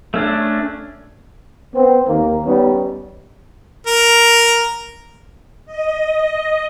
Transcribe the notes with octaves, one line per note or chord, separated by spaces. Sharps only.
A3 C#4 D4
B3 C4
D#2 D#3 A#3
G3 B3 C#4 D#4
A#4
D#5